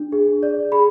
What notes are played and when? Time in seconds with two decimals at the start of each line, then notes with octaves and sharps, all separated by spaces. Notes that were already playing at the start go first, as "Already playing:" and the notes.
Already playing: D4
0.12 G#4
0.43 D5
0.72 G#4 B5